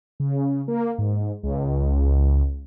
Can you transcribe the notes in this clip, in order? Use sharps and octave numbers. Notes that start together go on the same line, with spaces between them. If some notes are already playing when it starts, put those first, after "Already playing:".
C#3
A#3
G#2
C#2